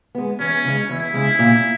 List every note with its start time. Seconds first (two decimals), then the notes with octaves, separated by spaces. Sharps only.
0.15 G#3 B3
0.40 E2 C#4
0.65 C#3 G#3
0.90 E2 E4
1.14 C#3 G#3
1.39 A#2